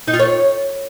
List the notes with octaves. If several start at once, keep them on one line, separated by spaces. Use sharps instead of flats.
D#4
F4
C#5